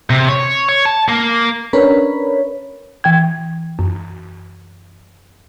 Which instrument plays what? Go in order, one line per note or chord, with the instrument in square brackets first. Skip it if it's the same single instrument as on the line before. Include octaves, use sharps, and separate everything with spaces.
[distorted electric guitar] C3
C#5
C#5
A5
A#3
[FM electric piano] C#4 D4 A#4 B4 C#5 B5
[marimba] E3 G5 G#6
F#2